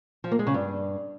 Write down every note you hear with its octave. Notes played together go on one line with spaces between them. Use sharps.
F3
A#3
G#3
C#3
G2